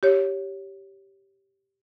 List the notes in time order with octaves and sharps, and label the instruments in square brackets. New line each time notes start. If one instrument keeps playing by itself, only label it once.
[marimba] G4 C#5